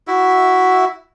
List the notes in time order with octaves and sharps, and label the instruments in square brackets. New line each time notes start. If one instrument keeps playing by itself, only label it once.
[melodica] E4 F#4 E5